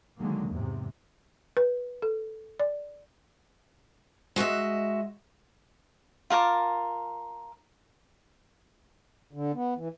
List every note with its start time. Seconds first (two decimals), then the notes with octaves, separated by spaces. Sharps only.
0.18 D3 D#3 F#3 G#3 A#3
0.50 E2 G#2 C3
1.57 B4
2.02 A4
2.60 D5
4.36 G#3 F#4 D#5 E5
6.30 F4 A#4 A5 D6
9.33 D3
9.54 B3
9.76 E3